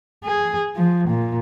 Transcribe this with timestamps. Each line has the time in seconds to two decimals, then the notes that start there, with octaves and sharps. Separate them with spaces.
0.24 G#4
0.75 F3
1.08 A#2